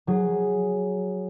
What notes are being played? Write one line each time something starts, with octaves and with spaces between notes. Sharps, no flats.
F#3 G#4